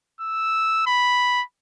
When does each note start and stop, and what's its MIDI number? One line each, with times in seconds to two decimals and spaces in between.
0.21 0.83 88
0.87 1.42 83